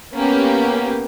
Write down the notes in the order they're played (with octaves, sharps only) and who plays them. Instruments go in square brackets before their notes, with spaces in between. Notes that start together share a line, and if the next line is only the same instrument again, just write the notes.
[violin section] A#3 B3 C#4 G4